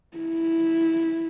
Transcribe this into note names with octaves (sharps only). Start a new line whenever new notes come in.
E4